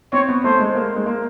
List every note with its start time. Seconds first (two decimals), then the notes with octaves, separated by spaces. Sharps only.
0.13 C4 C#5
0.28 B3
0.44 A3 C5
0.60 G#3
0.75 A#3
0.96 G#3
1.06 A#3